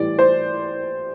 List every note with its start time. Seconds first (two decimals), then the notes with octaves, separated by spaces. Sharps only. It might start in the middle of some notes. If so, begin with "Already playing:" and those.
Already playing: A2 E3 G3 D5
0.19 C5